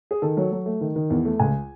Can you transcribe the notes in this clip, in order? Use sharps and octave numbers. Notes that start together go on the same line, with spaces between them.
G#4
D#3 A4
F#3
F#3
A3
D#3
D#3
E2
A3
C#2 G#5